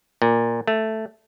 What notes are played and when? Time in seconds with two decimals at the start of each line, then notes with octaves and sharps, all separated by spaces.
0.22 A#2
0.67 A3